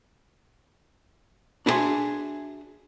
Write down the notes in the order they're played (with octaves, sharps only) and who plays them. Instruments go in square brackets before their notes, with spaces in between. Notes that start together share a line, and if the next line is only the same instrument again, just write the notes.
[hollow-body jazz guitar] D4 E4 F#4 G#4 E5 C6